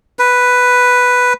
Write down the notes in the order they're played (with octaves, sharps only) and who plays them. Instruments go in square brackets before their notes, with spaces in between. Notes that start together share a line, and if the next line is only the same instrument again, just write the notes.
[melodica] B4